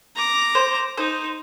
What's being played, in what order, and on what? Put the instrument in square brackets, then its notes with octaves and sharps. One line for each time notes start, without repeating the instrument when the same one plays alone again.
[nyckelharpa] A#5 D6
[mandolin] C5
[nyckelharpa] D#4 [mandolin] C5